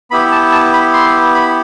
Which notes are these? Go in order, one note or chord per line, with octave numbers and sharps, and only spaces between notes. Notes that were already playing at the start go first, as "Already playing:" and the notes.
B3 E4 G4 B5
A5
A5
B5
C6
B5